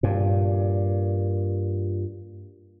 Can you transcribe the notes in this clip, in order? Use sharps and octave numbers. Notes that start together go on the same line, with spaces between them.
G2 A#2